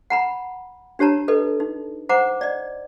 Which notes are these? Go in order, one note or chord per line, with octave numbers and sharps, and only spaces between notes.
F#5 A#5 B5
D4 G4 C#5 A5 A#5
A4 B4 D#5
D#4
C5 F#5 A#5 D6
D5 D#5